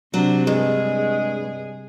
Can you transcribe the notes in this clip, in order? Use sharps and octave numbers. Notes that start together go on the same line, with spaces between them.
C3 F#3 D4
G2 G#3 G#4